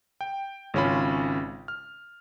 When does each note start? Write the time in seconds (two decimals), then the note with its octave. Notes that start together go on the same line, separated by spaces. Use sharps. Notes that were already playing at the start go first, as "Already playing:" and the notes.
0.21 G5
0.74 G#1 C#3 C#4 F4 B5
1.68 F6